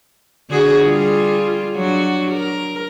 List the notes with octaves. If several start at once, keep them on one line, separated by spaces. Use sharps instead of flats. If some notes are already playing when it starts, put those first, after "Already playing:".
D3 F#4 G#4
G3 F4 G#4
F#3 D4 F#4
A#4